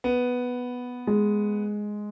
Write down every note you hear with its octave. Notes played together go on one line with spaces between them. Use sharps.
B3
G#3